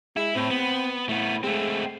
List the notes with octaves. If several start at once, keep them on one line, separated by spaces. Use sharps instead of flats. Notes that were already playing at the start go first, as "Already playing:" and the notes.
G#3 E4
A2 C4
B3
A2 A3 B3
G#3 A3 C4